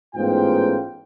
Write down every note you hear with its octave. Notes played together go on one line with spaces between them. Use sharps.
A1 G#2 B3 F4 G5